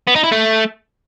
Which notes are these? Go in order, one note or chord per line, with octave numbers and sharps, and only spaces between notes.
B3
D#4
E4
A3